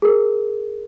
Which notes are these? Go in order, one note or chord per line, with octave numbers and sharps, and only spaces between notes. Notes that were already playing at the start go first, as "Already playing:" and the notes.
G#4 A#4